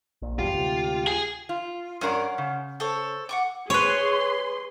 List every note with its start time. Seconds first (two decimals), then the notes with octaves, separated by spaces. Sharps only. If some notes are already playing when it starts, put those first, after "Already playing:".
0.22 A#1 A#2
0.39 E2 G2 B2 F4 G4
0.54 D2 G#2 C3
1.07 G#4
1.49 F4
2.01 G2 C#4 A#4 D5 F#5 C6
2.38 C#3
2.80 A4 C5 C#5
3.29 F#5 C#6 D6
3.70 G#4 B4 C#5 C6